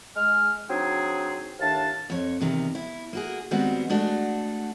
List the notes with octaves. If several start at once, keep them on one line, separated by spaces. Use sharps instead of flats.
G#3 F6
F#3 C4 D4 D#4 G#4
D#2 A2 D#3 D4 F5 A5
F2 C#5
E2 C3 D#3
E4
A#3 F#4 G#4
D#3 G3 G#3 B3 C4 F#4
G#3 A3 D4 F#4